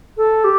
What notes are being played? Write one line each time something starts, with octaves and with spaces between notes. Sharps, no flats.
A4
G4